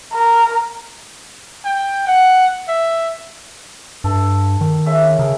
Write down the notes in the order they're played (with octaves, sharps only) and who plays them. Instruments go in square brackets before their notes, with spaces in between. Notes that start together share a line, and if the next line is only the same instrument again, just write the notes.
[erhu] A#4
[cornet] G5
F#5
E5
[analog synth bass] G2 [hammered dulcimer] A4
[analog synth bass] D#3
[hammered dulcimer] C#3 E5
[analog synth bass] C#3 [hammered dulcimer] G#4 A#4